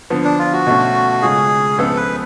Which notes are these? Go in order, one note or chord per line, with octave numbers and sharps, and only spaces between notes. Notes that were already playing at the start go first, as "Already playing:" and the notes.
D3 F3 B3
D4
F4
F#4
B2 A3 C#4
C#3 G#3 C#4 F4 G#4
C#2 C#3 F3 B3 F4 A4
B4